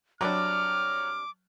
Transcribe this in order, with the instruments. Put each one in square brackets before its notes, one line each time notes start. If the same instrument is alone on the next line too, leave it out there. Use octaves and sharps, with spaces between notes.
[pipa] C3 G3 D4 [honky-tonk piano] F#3 [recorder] D6 [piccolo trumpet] F6